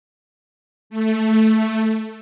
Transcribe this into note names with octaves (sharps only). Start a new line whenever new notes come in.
A3